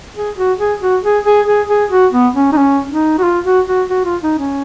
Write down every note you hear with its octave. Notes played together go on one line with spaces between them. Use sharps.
G#4
F#4
G#4
F#4
G#4
G#4
G#4
G#4
F#4
B3
C#4
D#4
C#4
D#4
F#4
F4
F#4
F#4
F#4
F4
D#4
C#4